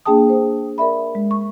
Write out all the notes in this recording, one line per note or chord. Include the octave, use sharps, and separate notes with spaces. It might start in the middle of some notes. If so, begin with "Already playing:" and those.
A#3 D4 G#4 G5 A5 D#6
A#3 C5
A#4 D5 E5 B5
G#3
C#6